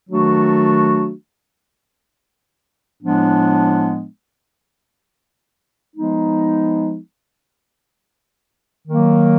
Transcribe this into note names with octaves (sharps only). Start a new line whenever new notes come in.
D#3 F#3 A3 D4 F#4
A2 F3 G#3 B3 D4
F3 G#3 B3 D#4
D#3 F#3 A#3